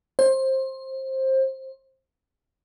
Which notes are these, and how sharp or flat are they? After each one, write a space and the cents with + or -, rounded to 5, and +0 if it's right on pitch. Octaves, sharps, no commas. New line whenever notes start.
C5 +20